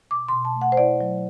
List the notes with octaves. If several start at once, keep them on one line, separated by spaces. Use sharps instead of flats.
B2 D6
B2 C6
A5
A3
F#5
C5
E4 D5
F#3